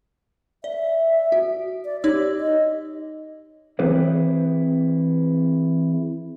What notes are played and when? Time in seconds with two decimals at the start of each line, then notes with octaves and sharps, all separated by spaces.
0.64 D5 E5
1.32 F#4
1.85 D5
2.04 D#4 G4 C#5 E6
2.41 D#5
3.79 E3 C4 E4 G#4 B4 C5